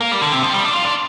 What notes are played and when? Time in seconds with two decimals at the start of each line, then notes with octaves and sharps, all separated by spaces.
0.01 A#3
0.11 G3
0.21 D3
0.32 C3
0.43 F3
0.53 G3
0.64 D4
0.73 F4
0.85 D4